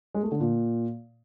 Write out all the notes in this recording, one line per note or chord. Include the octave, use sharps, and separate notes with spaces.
G#3
A3
D3
A#2